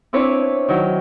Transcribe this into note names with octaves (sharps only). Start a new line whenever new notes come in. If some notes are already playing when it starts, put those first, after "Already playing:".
C4 D4 E4 B4 C#5
D#3 F#3 E4